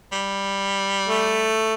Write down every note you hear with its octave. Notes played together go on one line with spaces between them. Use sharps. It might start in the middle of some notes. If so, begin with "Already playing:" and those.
G3
A3